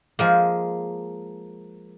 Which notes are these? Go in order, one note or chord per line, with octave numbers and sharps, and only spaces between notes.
F3 G#3 A#3